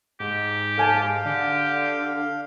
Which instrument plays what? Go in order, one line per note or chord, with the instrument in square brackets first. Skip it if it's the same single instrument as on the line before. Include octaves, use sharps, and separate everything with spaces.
[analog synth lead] G#2 [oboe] G4
[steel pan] A4 G#5 A5 [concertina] F5
[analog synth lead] D3 [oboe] G4